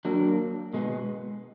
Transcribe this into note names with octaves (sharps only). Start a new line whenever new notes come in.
F#3 A#3 D4
B2 G#3 B3